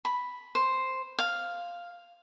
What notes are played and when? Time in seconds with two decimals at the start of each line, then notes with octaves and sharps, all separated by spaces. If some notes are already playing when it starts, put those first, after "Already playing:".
0.05 B5
0.55 C5
1.19 F5